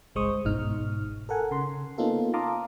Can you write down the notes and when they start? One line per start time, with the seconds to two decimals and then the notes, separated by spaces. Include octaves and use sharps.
0.15 G1 C2 G#3 C5 C#6 D#6
0.45 G1 G#2 B2 D#4 F6
1.29 A4 A#4 F#5 G#5
1.51 C#3 C6
1.98 A#3 B3 C#4 D#4 F4 A4
2.33 F5 A5 A#5 C6 D6 D#6